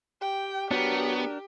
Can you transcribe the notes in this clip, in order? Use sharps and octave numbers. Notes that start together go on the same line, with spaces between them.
G4 G5
F#3 B3 D4 G4 A#4